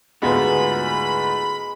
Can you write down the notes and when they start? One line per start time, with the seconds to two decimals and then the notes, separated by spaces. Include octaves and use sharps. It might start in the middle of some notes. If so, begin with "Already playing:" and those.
0.22 D2 G#2 G#3 B3 F4 F#4 B4 B5